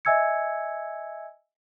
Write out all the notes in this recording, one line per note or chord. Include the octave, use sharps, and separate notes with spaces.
D#5 E5 G#5 E6 G#6 C#7